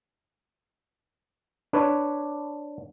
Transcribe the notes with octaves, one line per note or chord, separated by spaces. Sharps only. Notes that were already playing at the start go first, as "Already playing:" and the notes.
D4 B4 C#5